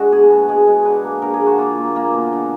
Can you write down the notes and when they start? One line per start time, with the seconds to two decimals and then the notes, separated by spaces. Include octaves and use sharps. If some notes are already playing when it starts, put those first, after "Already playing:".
Already playing: D3 G#3 F#4
0.12 B2 G#4
0.30 B2
0.49 G#3 G#4
0.67 G#3
0.85 D3 B4
1.04 A#3
1.22 D3 A#4
1.34 G#4
1.41 D3
1.47 F#4
1.58 A#3 F4
1.78 A#3
1.95 A#3 F4
2.14 B2
2.33 D3